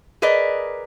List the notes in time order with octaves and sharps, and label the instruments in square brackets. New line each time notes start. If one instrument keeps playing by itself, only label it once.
[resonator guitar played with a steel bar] G#4 A#4 B4 D5 D#5